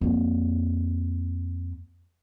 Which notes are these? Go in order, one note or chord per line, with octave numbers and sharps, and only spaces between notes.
F2 A#3